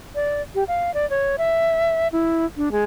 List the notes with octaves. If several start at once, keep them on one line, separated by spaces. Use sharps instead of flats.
D5
G4
F5
D5
C#5
E5
E4
D4
G#3